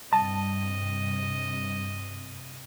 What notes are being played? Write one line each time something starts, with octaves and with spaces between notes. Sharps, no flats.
G2 C3 G3 D#5 A5